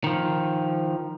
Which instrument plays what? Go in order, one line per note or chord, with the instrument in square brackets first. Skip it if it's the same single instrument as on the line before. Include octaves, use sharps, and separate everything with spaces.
[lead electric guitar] D#3 F3